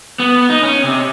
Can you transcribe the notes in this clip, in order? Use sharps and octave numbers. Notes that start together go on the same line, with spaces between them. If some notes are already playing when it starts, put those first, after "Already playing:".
B3
D#4
C#4
C3